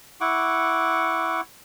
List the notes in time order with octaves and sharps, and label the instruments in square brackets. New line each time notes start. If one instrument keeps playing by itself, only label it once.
[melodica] E4 F#5 C#6 D6